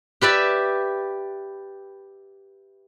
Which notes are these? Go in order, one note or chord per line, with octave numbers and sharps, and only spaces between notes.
G4 B4 D5 E5